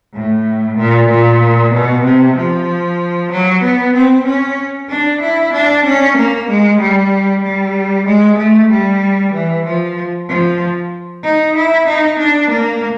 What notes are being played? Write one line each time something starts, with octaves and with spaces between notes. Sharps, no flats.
A2
A#2
A#2
B2
C3
F3
F#3
B3
C4
C#4
D4
E4
D4
C#4
A#3
G#3
G3
G3
G#3
A3
G3
E3
F3
F3
D#4
E4
D#4
D4
A#3